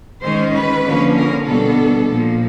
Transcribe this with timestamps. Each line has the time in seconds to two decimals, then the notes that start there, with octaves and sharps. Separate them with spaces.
0.22 D#3 G#3 C#4 C5
0.54 B4
0.84 D3 F3 A#3 C#4
1.16 A#4
1.46 B2 G3 B3 D4 A4
2.08 A#2 F3 A#3